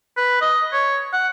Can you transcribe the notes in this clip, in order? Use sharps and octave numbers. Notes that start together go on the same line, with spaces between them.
B4
D#5
C#5
F#5